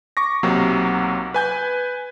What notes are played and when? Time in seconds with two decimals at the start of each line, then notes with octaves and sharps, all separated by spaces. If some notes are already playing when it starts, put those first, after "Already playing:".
0.17 C#6 D6 A#6
0.43 B1 C3 F#3 A#3
1.34 B4 G#5 G6